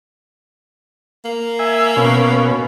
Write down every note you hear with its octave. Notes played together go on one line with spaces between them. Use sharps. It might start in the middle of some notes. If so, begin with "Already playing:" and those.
A#3
E5 G#5
B2 C#4